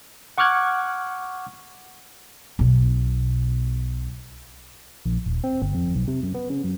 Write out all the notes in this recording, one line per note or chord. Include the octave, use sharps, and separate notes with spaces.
F#5 C#6 D6 F6 F#6 G#6
B1 B2
A#1
D#1
C4
G1
F2
B1
C3
F#2
B3
C#3
F#2